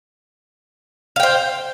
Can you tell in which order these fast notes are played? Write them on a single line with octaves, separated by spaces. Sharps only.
F5 G5 C5